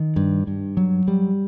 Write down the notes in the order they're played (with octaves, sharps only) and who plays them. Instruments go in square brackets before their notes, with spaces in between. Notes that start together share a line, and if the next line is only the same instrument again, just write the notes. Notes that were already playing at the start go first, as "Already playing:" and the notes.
Already playing: [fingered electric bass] D#3
G2
G2
F#3
G3